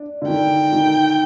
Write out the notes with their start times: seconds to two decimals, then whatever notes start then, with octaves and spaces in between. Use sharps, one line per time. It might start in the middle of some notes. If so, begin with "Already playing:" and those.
Already playing: D4
0.22 D3
0.27 D#3 G5
0.73 D#3